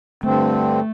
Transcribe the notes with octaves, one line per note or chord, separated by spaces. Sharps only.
G2 D3 A3 C4